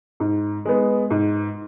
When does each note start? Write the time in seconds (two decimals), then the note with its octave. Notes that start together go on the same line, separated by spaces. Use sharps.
0.20 G#2
0.65 G#3 B3
1.10 G#2